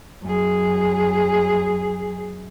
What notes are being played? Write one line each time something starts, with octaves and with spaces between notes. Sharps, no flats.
F#2 G#4